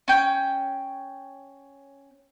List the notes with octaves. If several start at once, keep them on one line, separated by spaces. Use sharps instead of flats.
C#4 G5